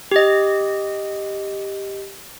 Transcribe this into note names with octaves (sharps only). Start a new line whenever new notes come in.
G4 D#5